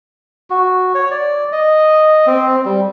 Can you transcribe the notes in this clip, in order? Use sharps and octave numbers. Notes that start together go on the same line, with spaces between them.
F#4
C#5
D5
D#5
C4
G3